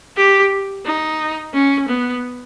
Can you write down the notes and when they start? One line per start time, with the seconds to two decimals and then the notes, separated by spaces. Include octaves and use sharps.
0.17 G4
0.85 D#4
1.54 C#4
1.88 B3